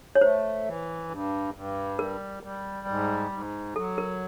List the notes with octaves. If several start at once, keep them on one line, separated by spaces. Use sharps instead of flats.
C#5
A3 C5
E3
G2
G2
G3 A#4
G3
G#2
G#2
F#3 A4
A#4